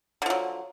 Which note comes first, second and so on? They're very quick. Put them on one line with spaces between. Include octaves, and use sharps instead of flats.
D3 F3 F#3